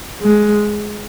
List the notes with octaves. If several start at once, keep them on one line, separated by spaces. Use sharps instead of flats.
G#3